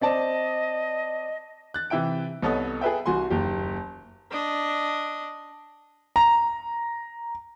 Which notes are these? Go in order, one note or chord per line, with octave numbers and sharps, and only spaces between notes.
C4 D5 D#5 A5
F#6 A6
C3 E3 E5 G5 D7
C2 B3 A4 C#5 D#5 D#6
G#4 A4 B4 E5 G5
C2 F#4 G#5 C6
F#1 D#2 G4
D4 D#5
A#5